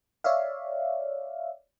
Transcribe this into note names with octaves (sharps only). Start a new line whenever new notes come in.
C#5 D5 E5 F5